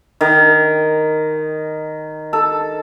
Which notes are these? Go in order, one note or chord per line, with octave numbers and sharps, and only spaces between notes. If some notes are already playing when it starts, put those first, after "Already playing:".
D#3
A4